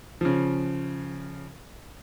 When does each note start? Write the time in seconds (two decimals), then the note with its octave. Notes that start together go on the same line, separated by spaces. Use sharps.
0.21 C#3 F3